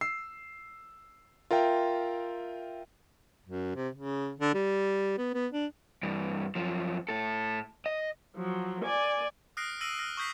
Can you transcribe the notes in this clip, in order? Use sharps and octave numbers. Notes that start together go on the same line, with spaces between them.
E6 C7
F4 A#4 E5 G5
F#2
C3
C#3
D3
G3
B3
B3
D4
G2 E3
F#2 F3
A2 A4
D#5
F3 F#3
D5 G#5
D#6 F6 F#6 A#6 C7 D7
E6 A#6 D7 D#7 F#7
F6 A#6
C#6 D#6 G6 B6 C7